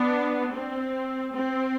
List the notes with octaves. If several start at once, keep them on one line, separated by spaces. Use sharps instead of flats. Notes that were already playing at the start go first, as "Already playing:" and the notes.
Already playing: B3 D4
C4
C4